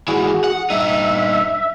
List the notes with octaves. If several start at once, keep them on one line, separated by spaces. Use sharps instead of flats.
G#2 E3 F#4 G#4
F#5
G2 D#4 E5